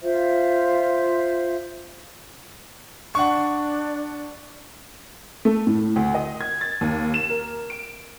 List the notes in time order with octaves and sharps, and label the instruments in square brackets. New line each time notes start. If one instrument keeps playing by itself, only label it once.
[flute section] F4 C5 E5 F5
[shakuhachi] D4 [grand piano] F#5 C#6
[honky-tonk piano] A3
A2
D2
D#5
G#6
A6
D#2
E7
A#4
D7